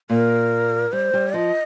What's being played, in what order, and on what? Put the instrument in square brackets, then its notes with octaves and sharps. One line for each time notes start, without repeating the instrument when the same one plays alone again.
[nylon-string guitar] A#2 [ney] A#4
[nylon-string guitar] G3 [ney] C5
[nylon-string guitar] G3
[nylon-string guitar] F3 [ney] D#5